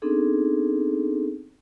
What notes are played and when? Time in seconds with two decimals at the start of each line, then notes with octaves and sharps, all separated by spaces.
0.02 B3 C4 D4 D#4 G#4 A4